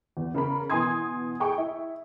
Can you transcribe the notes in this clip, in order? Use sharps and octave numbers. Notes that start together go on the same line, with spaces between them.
E2
C#3 A#4 B5
B2 E3 G#5 C6 D#6 G#6
G#4 G5 C#6
E4